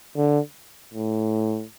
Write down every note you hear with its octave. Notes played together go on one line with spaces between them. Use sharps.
D3
A2